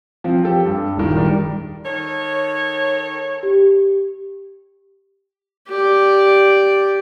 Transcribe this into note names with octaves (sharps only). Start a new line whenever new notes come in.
F3 C4
G4 A4 G5
G2
D#1 D#3
D#3 G3
D#3 A4 C#5
G4
G4 D5